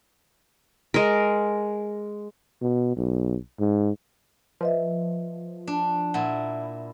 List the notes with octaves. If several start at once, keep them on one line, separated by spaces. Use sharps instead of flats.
G#3 A#4
B2
B1
G#2
F3 B4 D#5 E5
D4
A#2 E4 F#5